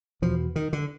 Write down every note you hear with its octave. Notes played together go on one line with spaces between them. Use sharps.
E2 B2 F3
D#3
D3